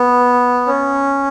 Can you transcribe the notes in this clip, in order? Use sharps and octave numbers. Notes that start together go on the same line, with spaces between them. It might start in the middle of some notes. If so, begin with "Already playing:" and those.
Already playing: B3
C#4